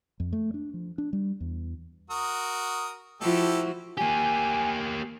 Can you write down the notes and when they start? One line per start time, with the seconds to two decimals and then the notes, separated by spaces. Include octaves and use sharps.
0.20 F2
0.33 A3
0.54 D4
0.74 F3
0.98 D4
1.13 G3
1.40 E2
2.10 F#4 A#4 D#6
3.21 F3 E4 F#4 G4 A4
3.98 A#3 G4 G#5